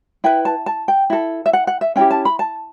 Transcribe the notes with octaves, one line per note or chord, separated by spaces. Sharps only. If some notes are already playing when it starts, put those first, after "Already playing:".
E4 B4 G5
A5
A5
G5
E4 A4
E5
F#5
F#5
E5
C#4 E4 G4 G5
A5
B5
A5